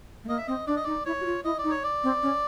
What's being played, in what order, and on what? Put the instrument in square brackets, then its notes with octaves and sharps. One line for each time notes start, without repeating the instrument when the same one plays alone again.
[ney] A3
[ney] A#3 [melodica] D#5
[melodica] E5
[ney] C4 [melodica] D#5
[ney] D4 [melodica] D5
[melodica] D#5
[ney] D#4 [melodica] D5
[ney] E4 [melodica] C#5
[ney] F#4
F4
[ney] E4 [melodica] D#5
[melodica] D5
[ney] D#4
[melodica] C#5
D5
[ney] C4
C#4